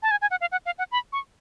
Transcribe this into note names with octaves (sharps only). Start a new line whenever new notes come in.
A5
G#5
G#5
F#5
F5
F#5
F5
F#5
B5
C#6